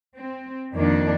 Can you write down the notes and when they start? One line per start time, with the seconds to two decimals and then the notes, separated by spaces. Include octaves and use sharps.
0.19 C4
0.74 F2 D#3 A#3 D4